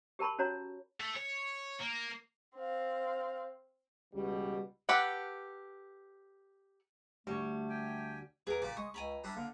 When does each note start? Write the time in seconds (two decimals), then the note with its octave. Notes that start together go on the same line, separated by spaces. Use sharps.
0.19 G4 A#4 A5 B5 C#6
0.39 C#4 F#4 C#5 A#5
1.00 A3
1.16 C#5
1.80 A#3
2.56 C4 F5
4.14 C#2 B2 E3 G3
4.89 G4 A4 B4 F#5
7.27 D2 G3 A3 C#5
7.69 G4 G5 G#5
8.47 E2 G#4 A#4
8.62 A#2 A#3 G4 D5
8.77 G#3 C#6 D#6
8.94 C#2 G#5 A#5 B5
9.24 G3 D4 E4
9.36 D3 A#3